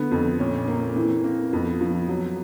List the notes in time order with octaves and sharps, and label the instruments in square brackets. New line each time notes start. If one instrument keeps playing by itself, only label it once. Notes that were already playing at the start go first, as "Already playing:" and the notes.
Already playing: [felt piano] D3 [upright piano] A3 B3
[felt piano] F2 [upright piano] C4
[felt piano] A#2 [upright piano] C#4
[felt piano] A#3 [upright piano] C4
[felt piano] E3 [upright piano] C4
[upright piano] A#3 [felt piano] C4
[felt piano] F2 [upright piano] B3
[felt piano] F3
F#3